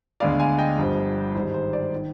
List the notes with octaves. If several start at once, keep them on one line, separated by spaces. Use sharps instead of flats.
D2 D3 G#3 B3 D5 F5
F5 G#5
D#5 G5
G1 G2 F3
G#1 G#2 G3 C5
C5
D5
D#3